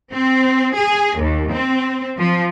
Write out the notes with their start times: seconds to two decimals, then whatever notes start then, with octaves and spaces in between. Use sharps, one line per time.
0.11 C4
0.75 G#4
1.18 D#2
1.51 C4
2.18 F3